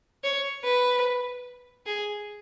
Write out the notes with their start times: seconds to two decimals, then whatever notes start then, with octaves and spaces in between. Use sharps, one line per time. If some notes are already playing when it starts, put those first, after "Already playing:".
0.24 C#5
0.64 B4
1.86 G#4